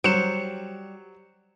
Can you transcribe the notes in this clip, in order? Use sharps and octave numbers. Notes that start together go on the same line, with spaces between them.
F#3 G3 C5 C#7 E7